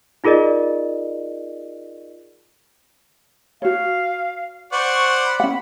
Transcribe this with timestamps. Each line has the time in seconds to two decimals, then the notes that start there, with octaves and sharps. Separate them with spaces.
0.24 D#4 F4 G#4 A#4 D5 D#5
3.62 F#4 C#5 F5
4.72 C5 D5 F#5 C#6
5.25 B5
5.40 C#4 F#5